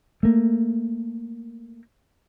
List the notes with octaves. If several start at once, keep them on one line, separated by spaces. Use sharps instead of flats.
A3 A#3